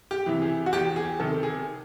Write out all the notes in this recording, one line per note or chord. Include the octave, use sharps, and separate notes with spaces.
G4
C3 E3
G#4
F#4
E2 G4
G#4
C3 D#3 A4
G#4